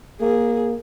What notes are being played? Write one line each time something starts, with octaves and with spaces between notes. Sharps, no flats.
A#3 G#4